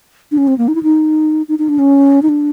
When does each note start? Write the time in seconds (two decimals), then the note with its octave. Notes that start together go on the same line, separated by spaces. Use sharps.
0.32 D4
0.38 C#4
0.48 C4
0.58 A#3
0.68 D#4
0.75 E4
0.83 D#4
1.49 D#4
1.59 D#4
1.69 D4
1.79 C#4
2.22 D#4
2.29 D4